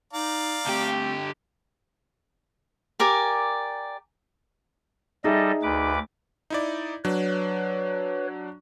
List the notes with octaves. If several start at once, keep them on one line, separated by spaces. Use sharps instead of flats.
D#4 D5 F5 A#5
D3 A3 C4 G4 G5
G4 A#4 D5 G#5
G3 D#4 G#4 A4 D#5 E5
D2 B4 D6
D#4 E4 D5
F#3 D4 B4 C#5